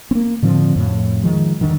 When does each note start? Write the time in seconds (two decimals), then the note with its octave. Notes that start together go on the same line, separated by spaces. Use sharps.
0.11 A#3 C4
0.42 A2 D3 F3 C4
0.75 F2 A2
1.23 D#3 F3 G#3
1.61 E2 G2 D3 D#3